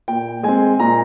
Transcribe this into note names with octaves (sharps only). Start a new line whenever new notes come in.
A#2 G5
G#3 C4 G#5
A#2 A#5